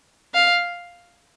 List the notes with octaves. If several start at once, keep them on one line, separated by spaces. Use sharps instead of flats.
F5